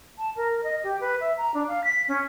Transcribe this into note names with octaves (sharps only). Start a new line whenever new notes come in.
A5
A#4
D#5
G4
B4
E5
A#5
D4
F5
B6
C#4